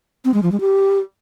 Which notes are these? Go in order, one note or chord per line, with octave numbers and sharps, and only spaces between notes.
C4
G#3
F3
G#3
G4